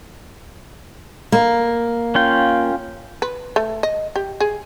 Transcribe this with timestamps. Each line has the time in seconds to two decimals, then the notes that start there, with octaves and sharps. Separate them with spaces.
1.32 A#3
2.15 C#4 F4 G5
3.22 B4
3.56 A3
3.83 D#5
4.16 G4
4.40 G#4